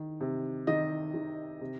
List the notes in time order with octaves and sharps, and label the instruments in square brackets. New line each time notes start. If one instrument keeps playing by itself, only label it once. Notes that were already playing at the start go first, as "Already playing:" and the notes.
Already playing: [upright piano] D#3
C3
D#3 D#5
D#3
C3